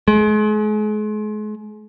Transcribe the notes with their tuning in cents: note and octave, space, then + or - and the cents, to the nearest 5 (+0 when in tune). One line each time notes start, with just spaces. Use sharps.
G#3 +40